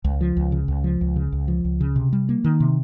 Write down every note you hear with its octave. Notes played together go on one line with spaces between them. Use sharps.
C#2
F3
C#2
C#3
C#2
F3
C#2
C#3
C#2
F3
C#2
C#3
C3
G3
A#3
D#3
C3